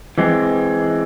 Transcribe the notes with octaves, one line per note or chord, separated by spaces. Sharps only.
E3 G#3 C4